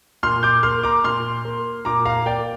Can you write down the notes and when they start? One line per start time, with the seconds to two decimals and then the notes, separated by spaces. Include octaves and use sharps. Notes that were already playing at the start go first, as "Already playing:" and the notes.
0.23 A#2 C6 F6
0.43 D6 G6
0.63 A#3 C6 F6
0.83 A#5 D6
1.04 A#2 C6 F6
1.45 A#3
1.85 A#2 A#5 D6
2.06 F5 A#5
2.26 A#3 D5 G5